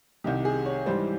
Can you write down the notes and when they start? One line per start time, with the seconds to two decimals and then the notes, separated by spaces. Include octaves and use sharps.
0.24 C2 C3 D#3 G4
0.45 G#4
0.66 C#5
0.86 G#2 E3 G3 C5